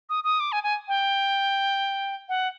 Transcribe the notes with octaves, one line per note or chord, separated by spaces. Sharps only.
D#6
D#6
D6
G#5
G#5
G5
F#5